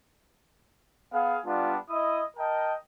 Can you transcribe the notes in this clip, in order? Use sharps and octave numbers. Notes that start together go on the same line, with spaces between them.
B3 G#4 F5
G3 B3 D4 F4
E4 D#5 D#6
A#4 D#5 G5 A5